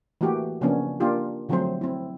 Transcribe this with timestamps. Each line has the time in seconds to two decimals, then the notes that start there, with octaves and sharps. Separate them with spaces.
0.21 E3 A3 A#3 F#4 G4
0.61 C#3 F3 A#3 B3 C#4 D4
1.00 A#3 D4 F4 G4
1.49 D3 F3 F#3 A3 C4 C5
1.81 C4 E4